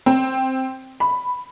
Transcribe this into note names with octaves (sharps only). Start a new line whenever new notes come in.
C4
B5